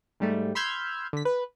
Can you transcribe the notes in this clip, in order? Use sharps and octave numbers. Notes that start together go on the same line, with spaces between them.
G#2 G3 A3
B5 C6 E6 F6 G6 G#6
D3 B6
B4